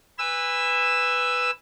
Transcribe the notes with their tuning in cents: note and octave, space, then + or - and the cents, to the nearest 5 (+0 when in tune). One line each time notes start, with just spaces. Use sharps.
B4 +5 G#5 -25 E6 +5